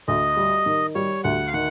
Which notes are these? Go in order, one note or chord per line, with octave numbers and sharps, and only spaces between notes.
D2 D#5
G3
D#3
G3 C#5
D2 F#5
F5
D#3 F#5